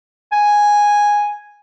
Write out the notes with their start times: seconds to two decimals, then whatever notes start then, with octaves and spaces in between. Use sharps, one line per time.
0.32 G#5